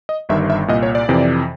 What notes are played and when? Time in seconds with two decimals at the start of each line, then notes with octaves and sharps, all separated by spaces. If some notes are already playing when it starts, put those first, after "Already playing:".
0.09 D#5
0.29 G1 G2 D#3 E5
0.50 E5
0.68 C2 A#2 D#5
0.83 C#5
0.95 D5
1.09 F2 C3 E3